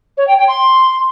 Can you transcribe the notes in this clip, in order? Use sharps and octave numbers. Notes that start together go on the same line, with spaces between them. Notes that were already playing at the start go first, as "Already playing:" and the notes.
C#5
G5
G5
C6